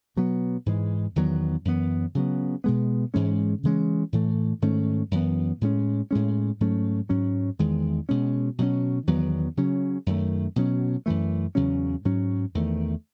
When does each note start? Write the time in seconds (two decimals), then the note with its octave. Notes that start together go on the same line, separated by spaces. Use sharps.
0.16 B2 F#3 B3
0.66 G#2 E3 G#3
1.16 E2 D#3 F#3 B3
1.65 F#2 E3 B3
2.15 C#3 F#3 B3
2.64 B2 G#3 B3
3.14 G#2 E3 G#3 C#4
3.63 C#3 E3 G#3 C#4
4.13 A2 E3 A3
4.62 G#2 D#3 A3 C#4
5.11 F#2 E3 B3
5.61 A2 G#3 C#4
6.11 A2 G#3 C#4
6.60 G#2 F#3 A3 C#4
7.09 G#2 F#3 C#4
7.59 E2 D#3 G#3
8.09 B2 G#3 C#4
8.58 B2 F#3 A3 C#4
9.07 E2 D#3 F#3 B3
9.57 C#3 F#3 C#4
10.06 F#2 D#3 A3
10.56 B2 F#3 C#4
11.06 F#2 E3 A3
11.55 E2 C#3 F#3 C#4
12.05 G#2 F#3 C#4
12.55 E2 D#3 A3